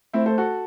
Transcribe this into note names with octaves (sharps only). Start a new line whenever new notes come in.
A3 C4 E4
A4 C5
F#4 A4